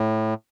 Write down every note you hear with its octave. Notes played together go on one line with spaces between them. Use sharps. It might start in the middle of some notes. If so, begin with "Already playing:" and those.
Already playing: A2